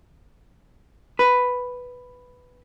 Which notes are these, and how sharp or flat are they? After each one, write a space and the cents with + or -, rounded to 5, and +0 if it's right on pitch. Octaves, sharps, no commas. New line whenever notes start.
B4 +5